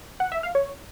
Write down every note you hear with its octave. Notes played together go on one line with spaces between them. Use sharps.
F#5
E5
F5
C#5